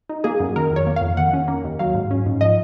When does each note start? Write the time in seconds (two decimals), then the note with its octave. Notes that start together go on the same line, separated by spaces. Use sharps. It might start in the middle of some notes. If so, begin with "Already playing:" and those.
0.09 D#4
0.24 A#3 G#4
0.40 F#2
0.56 D#3 A#4
0.71 F2
0.76 C#5
0.87 A#3
0.96 F5
1.01 F2
1.17 D#3 F#5
1.33 C#4
1.48 A#3
1.64 D#2
1.79 F#3 F5
1.94 G#2
2.11 C#4
2.26 G#2
2.41 F3 D#5